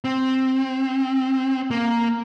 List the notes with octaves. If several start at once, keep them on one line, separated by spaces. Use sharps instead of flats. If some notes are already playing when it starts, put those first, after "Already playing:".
C4
A#3